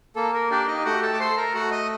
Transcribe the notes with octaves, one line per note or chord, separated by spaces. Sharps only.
A#3 A4
A#4
D4 G4 D5
D#4 D#5
A3 F#4 F#5
A4 A5
D6
A4 C5 C6
A#4 A#5
A3 F#4 F#5
D#5 D#6